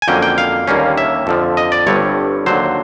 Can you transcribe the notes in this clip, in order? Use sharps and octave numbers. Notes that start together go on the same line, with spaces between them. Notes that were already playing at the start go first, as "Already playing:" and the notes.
G#5
F2 D3 F#3 A#3 C#4 G5
G5
F5
D#2 D3 G3 A#3 C#4
E5
F2 D3 F3
D#5
D5
G1 G2 D3 G3 C4 C#5
D#2 D3 F#3 C5